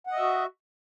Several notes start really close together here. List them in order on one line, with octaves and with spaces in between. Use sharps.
F#5 D#5 E5 F#4